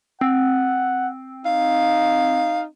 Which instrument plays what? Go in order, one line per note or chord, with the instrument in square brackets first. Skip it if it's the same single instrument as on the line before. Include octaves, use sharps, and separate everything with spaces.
[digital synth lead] C4 [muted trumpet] F#5
[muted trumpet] D#4 [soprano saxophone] F5